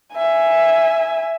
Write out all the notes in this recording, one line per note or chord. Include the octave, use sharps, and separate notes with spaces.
E5 G#5